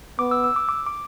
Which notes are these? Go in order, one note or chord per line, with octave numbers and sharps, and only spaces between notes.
B3 D6
E6
E6
D6
D6
D6